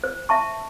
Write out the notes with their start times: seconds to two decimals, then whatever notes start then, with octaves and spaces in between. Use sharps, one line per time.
0.04 C5
0.29 E5 A5 C#6